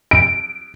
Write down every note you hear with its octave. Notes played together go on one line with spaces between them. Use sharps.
D7